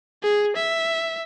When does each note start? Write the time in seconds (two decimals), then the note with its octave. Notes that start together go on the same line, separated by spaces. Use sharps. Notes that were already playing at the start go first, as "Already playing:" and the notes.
0.23 G#4
0.56 E5